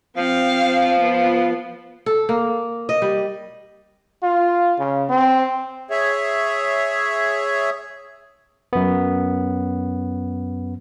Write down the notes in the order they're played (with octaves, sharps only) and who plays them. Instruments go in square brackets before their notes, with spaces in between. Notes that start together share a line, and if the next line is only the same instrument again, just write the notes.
[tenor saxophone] F3 [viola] C4 F5
[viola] B3 F4
[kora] A4
A#3
D#5
G3
[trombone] F4
C#3
C4
[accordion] G#4 C#5 E5
[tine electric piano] F#2 B3